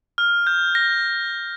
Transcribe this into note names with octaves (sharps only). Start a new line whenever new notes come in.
F6
G6
A#6